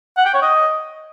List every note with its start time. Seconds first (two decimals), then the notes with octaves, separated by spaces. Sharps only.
0.17 F#5
0.25 G5
0.34 C#5
0.42 D#5